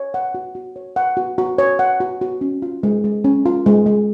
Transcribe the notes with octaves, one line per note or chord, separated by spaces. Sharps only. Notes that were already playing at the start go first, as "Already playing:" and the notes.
Already playing: C#5
F#5
F#4
F#4
C#5
F#5
F#4
F#4
C#5
F#5
F#4
F#4
C#4
F4
G#3
G#3
C#4
F4
G#3
G#3